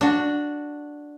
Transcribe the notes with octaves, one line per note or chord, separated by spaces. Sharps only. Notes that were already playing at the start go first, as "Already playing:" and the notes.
D4 F#4